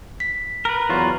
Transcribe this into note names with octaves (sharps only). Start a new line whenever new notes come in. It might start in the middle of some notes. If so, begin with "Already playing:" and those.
B6
A#4 B4
E2 F#3 F4